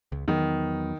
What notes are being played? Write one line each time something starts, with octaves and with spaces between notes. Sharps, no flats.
C#2
E2 D#3 F#3 B3